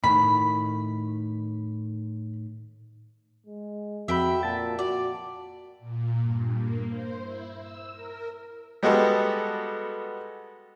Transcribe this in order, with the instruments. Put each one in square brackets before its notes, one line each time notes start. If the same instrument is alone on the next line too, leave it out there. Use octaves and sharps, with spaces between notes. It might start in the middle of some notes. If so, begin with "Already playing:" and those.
[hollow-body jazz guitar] A2 D#3 [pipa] B5
[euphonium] G#3
[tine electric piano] F2 B5 [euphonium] F#4 [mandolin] E5 G5
[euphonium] A#2 [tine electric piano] A5 A6
[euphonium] F#4 [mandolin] D5
[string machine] A#2
G2
A#3
C5
E4
E6
A#4
[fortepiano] G3 G#3 B3 F#4 G4 A4